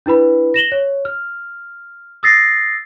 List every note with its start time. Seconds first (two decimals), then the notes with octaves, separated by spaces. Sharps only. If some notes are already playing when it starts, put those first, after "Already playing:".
0.06 D4 E4 B4 B5
0.54 A#6 E7 F#7 G7
0.72 C#5
1.05 F6
2.23 D#6 E6 A6 A#6 C7